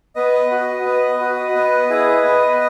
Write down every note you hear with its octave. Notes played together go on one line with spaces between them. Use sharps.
B3 B4 D#5
F#4
B3
F#4
B3
E4 G#4
B3